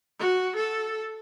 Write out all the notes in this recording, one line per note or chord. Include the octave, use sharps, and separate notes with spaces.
F#4
A4